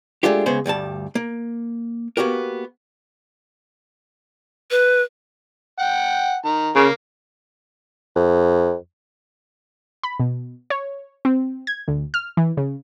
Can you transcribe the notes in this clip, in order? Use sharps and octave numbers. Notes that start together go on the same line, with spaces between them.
G#3 A3 D4 F4 G4
C#3 G#3 B3 G#4 B4 C5
D2 G2 G3 A5
A#3
A#3 B3 F#4 G4 A#4
B4
F#5 G5
D#3 A#5
C#3 A#3
F2
B5
B2
C#5
C4
G#6
D2
F6
E3
C#3